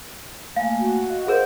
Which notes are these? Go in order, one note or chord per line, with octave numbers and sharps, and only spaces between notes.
A3 A#3 F5 G#5
F#4
D#5 F5 F#5
G#4 A#4 C5